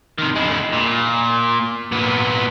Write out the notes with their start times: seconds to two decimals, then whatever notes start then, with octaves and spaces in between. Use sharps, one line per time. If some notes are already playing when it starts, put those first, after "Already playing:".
0.18 C3 D#3
0.36 G#3 E4
0.72 A#2
1.92 A#2 B3